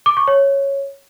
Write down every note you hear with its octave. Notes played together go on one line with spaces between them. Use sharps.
D6
C#6
C#5